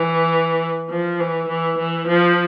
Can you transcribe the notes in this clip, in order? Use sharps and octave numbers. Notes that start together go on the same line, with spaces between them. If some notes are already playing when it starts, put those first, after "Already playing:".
Already playing: E3
F3
E3
E3
E3
F3